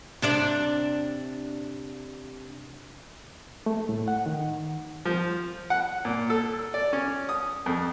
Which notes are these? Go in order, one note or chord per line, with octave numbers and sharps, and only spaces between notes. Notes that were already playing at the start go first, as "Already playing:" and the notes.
C3 D4 D5
A3
A2
F#5
D#3
F3
F#5
A#2
A4
D5
C#4
D#6
F2